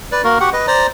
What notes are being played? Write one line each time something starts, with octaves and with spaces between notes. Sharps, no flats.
B4 D5
A#3 F#4 A#4
F#4 G4 F#5
B4 D#5
C5 D5 A#5